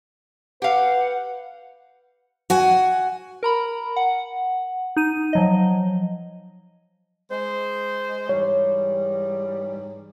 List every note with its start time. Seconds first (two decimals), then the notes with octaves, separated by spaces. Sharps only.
0.62 G4 B4 F5 F#5
2.50 F#4 F#5 G#5
3.43 A#4 A#5 B5
3.96 F#5
4.97 D#4 D#7
5.33 F3 F#3 D#5
7.31 G#3 C5
8.29 G#2 E3 G3 C#5